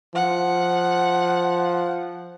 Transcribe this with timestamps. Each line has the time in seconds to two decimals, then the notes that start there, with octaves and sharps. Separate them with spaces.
0.15 F3 F#5